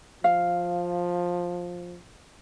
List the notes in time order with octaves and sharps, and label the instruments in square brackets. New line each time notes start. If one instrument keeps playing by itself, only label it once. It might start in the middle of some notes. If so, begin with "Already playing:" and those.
[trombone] F3 [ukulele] F5